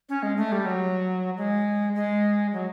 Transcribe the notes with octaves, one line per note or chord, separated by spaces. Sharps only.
C#4
G#3
A3
G3
F#3
G#3
G#3
F#3